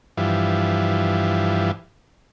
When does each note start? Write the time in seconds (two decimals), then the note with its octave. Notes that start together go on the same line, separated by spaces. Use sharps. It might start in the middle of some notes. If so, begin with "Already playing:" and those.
0.17 G2 E3 F3